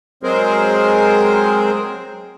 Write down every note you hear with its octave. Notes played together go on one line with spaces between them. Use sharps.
F#3 G#3 C4 G#4 A#4 C5